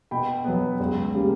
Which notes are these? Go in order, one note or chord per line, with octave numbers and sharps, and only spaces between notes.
B2 G5 B5
F#3 B3
C#2
C#3 G3 A#3